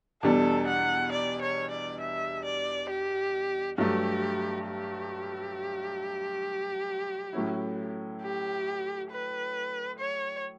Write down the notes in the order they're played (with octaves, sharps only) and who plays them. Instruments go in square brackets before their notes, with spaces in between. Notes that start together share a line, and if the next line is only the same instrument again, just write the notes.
[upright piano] E2 B2 G3 D4 [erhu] A4
[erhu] F#5
D5
C#5
D5
E5
D5
G4
[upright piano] G2 F#3 A3 [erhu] G4
[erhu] G4
[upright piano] A2 F#3 C#4 E4
[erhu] G4
B4
C#5